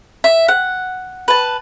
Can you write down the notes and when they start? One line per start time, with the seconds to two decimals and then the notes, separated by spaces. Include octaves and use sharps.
0.24 E5
0.48 F#5
1.28 B4 A5